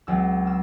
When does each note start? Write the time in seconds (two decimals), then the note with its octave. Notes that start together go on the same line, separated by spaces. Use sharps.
0.07 C#2 C#3 F#3 C4 E6
0.47 E6